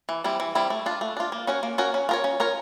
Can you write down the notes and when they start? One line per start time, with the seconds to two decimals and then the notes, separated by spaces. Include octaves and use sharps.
0.09 E3
0.24 G3 C4 E4
0.40 E3
0.55 G3 C4 E4
0.70 A3
0.86 D4 F4
1.01 A3
1.17 D4 F4
1.32 A#3
1.47 C#4 F#4 A#4 C#5
1.63 A#3
1.78 C#4 F#4 A#4 C#5
1.94 C#4
2.09 F4 A#4 C#5
2.24 C#4
2.40 F4 A#4 C#5